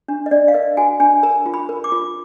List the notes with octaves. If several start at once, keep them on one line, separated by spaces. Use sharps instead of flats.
D4
D#5
D4 D5
F5
A#4 D#5
F#4 G#5
D4 G#5
A#4 A#5
F4
B5
A#4
D6
F4